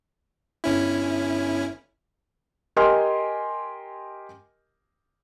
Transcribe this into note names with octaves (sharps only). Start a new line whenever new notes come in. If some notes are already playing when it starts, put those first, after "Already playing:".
G1 C#4 E4
G4 A#4 D#5 G#5 C6 F6